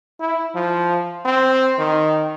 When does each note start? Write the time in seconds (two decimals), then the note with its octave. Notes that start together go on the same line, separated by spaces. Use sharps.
0.20 E4
0.55 F3
1.25 C4
1.79 D#3